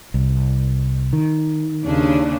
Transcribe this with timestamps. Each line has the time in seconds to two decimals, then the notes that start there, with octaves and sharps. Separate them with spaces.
0.14 C2
1.13 D#3
1.85 D#2 C#3 D4